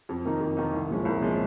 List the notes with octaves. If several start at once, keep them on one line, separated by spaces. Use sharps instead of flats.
F2
D#3 A#3 D#4
F2
D#3 A#3 D#4
C2
A#2 F3 G#3 C#4
C2
A#2 F3 G#3 C#4